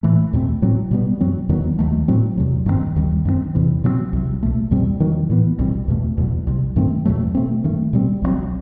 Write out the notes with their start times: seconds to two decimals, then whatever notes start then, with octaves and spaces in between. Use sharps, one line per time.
0.03 A2 E3 A3
0.33 E2 B2 A3 C4
0.62 A2 F#3 C4
0.91 B2 G3 B3
1.20 F#2 F#3 C4
1.49 E2 D#3 F#3 B3
1.79 D#2 D#3 F#3 A3
2.08 A2 F#3 C4
2.37 E2 C3 F#3
2.66 G2 D#3 F#3 C4
2.96 D#2 D#3 G3
3.25 F#2 D#3 A3 C4
3.55 E2 C3 E3
3.84 B2 F#3 A3 C4
4.13 C2 C3 F#3
4.43 C2 B2 A3
4.71 E2 B2 G3 C4
5.00 E2 D#3 F#3
5.30 A2 E3 B3
5.59 C2 B2 G3 C4
5.88 E2 B2 A3
6.18 E2 B2 F#3
6.47 C2 C3 F#3
6.76 G2 D#3 A3 C4
7.05 E2 B2 F#3 A3
7.35 B2 A3 C4
7.64 G2 D#3 A3
7.93 B2 G3 C4
8.22 C2 C3 F#3 C4